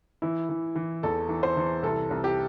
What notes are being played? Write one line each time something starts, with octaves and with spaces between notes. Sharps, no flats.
E3 E4
E3
E3
E2 A4
E3
C5
E3
C2 A4
C2
G4